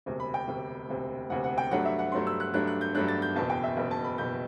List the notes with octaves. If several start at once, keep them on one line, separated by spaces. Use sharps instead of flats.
E1 D2 C3
B5
G5
E1 D2 C3
E1 D2 C3
E1 D2 C3 F#5
F#5
G5
G2 F#3 A3 D4 F#5
E5
F#5
G2 F#3 A3 D4 C6
E6
F#6
G2 F#3 A3 D4 F#6
F#6
G6
G2 F#3 A3 D4 F#6
A6
G6
F#1 E2 B2 A5
G5
E5
F#1 E2 B2
A5
B5
F#1 E2 B2 G6